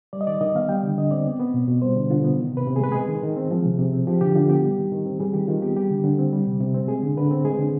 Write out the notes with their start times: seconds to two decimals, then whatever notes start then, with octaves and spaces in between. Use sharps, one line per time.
0.13 G3 D5
0.21 D#5
0.27 D#3 D5
0.41 D#3 D#5
0.55 B3 F5
0.69 G3 G5
0.83 D3
0.98 D3 D#5
1.11 C4 D5
1.26 B3
1.39 B3
1.54 B2
1.68 B2
1.82 G3 C5
1.96 D3
2.10 D3 F4
2.24 B3
2.38 D#3
2.52 C3 B4
2.67 C3
2.76 G#4
2.80 G#3 B4
2.92 G#3 G#4
3.09 D#3
3.23 D#3
3.37 C4
3.51 F3
3.65 C3
3.79 C3
3.93 C4
4.07 F3 G4
4.21 D3 G4
4.35 D3 F4
4.49 B3 G4
4.64 G3
4.78 D#3
4.92 D#3
5.06 C4
5.20 G3 G#4
5.33 D#3 G4
5.48 D#3 F4
5.62 B3 G4
5.76 G3 G4
5.90 D3
6.04 D3
6.19 C4
6.33 G3
6.47 C3
6.60 C3
6.75 C4
6.88 G#3 G#4
7.03 D3
7.17 D3 B4
7.31 C4
7.45 G#3 G#4
7.59 D3